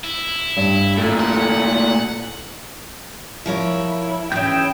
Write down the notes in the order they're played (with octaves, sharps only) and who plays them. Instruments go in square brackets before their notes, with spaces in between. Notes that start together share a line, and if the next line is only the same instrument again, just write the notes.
[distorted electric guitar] E4
[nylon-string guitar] G2
[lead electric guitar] A#2 A3 [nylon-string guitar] A4
[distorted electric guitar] F#5
[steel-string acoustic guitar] F3 A#4 C#5 [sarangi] E4
[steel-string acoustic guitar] E3 C#4 [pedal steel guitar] E4 G#4 G6 [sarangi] G5